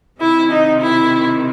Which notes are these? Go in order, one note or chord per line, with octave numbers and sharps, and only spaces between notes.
C3 D#3 E4
D#4
E4